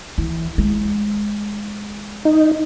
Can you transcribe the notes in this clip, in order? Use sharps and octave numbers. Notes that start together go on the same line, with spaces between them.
E3
G#3
D#4